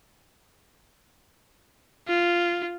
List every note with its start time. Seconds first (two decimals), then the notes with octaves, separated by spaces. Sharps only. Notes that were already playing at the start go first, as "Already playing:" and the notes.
2.08 F4